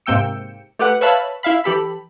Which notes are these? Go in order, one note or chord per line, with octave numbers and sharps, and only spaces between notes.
G#2 C3 A#3 G5 E6 C#7
A3 G4 B4 F#5
B4 C#5 E5 F5 A5 B5
E4 E5 F5 B5
E3 G4 A4 B5